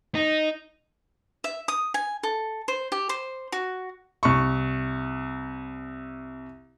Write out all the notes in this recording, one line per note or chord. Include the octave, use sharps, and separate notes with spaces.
D#4
E5
D#6
G#5
A4
C5
G4
C5
F#4
C2 C#6